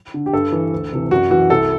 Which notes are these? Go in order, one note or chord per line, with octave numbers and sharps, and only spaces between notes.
D3
G4
G2 A4
E3
D2
C3 E3
F#2 F#4
E3 F#4
C2 A4